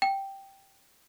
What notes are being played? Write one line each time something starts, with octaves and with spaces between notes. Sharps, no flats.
G5